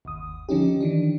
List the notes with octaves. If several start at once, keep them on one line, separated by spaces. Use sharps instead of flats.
G1 D#2 D#6
D3 F3 C#4 D#4 G4
D#3 E3 D4